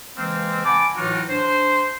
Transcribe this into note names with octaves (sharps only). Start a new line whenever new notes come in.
C#3 E3 G#3 A#3 C4
F#5 G#5 A5 B5 D6
A2 E3 F#3 D#4 F4 F#4
D4 C5